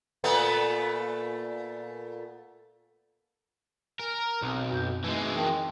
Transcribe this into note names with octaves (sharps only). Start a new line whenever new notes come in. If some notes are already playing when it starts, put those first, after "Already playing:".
A#2 A3 B3
A#4 G#5
B1 C4
F#2 G6
E3 G#3 A3 D#4
A#4 G5 A5